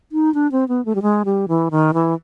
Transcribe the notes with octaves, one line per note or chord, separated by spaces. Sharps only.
D#4
D4
C4
B3
A3
G3
G#3
G3
E3
D#3
E3